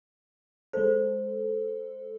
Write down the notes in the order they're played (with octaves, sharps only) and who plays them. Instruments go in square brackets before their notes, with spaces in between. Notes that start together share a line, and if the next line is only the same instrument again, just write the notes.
[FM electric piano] G#3 A4 [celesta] C5